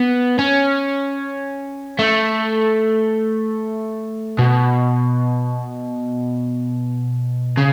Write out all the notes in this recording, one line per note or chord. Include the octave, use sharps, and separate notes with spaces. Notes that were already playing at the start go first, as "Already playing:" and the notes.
Already playing: B3
C#4
A3
B2
C#3